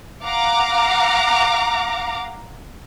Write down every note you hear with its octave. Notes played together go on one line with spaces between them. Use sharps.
F5 F#5 A#5 D6